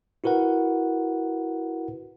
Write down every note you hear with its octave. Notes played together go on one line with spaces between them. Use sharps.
E4 F#4 A#4 B4 F#5